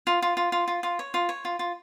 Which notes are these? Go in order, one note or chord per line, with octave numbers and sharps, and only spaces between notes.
F4
F4
F4
F4
F4
F4
C#5
F4
C#5
F4
F4